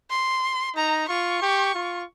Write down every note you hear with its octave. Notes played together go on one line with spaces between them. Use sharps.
C6
D#4 A#5
F4 C#6
G4
F4